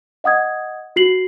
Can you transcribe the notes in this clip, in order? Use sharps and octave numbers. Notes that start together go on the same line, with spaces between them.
D#5 F#5 D#6 G#6
F#4 C7 F#7